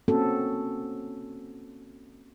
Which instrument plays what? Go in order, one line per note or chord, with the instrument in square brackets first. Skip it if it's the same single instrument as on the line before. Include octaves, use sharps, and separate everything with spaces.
[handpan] A#3 C4 C#4 F#4 A4